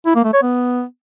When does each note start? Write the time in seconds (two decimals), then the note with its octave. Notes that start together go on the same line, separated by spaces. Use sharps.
0.06 E4
0.15 A#3
0.24 A3
0.33 C#5
0.43 B3